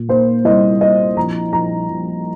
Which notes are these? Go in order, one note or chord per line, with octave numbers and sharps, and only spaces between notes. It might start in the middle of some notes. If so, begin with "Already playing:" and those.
Already playing: A#2
A#3 C5
C2 D#5
A#3 D#5
A#1 A#5
A#1 A#5
A#1